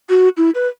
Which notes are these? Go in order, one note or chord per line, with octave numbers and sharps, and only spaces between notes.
F#4
E4
B4